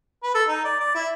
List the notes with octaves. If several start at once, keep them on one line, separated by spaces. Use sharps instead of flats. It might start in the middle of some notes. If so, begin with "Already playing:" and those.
B4
A4
D#4
D5
D5
E4